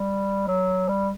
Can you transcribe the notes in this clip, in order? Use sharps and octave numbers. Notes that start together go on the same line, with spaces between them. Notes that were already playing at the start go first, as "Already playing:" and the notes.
Already playing: G3
F#3
G3